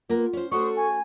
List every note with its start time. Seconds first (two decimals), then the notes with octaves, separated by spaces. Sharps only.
0.09 A#3 B3 F4 A#4
0.33 C#4 C5
0.51 A3 C#4 F#4 A4 C5 C#6 D#6
0.76 G#5